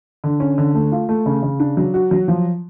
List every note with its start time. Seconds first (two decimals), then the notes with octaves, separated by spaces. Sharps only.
0.24 D3
0.40 C#4
0.58 D3
0.75 A3
0.92 F4
1.09 A3
1.26 C#3
1.43 C#3
1.60 D4
1.77 F#3
1.94 F#4
2.11 F#3
2.28 F3